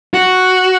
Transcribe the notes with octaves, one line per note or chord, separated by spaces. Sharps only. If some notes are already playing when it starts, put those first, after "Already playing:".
F#4